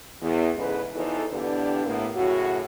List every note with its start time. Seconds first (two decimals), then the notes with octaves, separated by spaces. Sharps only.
0.21 E2
0.57 E2 G#2 C#3 A4 B4
0.95 E2 E3 F3 D#4 A4
1.32 G2 D3 E3 B3 D4 G4
1.86 A2 A#3 B3
2.15 F#2 A2 C#3 F#4